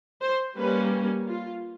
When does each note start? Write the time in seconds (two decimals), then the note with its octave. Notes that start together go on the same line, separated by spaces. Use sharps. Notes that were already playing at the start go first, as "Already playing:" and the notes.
0.22 C5
0.57 G3 A#3 C#4 B4
1.28 F4